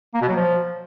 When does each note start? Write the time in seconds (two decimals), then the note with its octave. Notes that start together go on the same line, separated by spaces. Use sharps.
0.14 A#3
0.21 B2
0.29 F#3
0.36 F3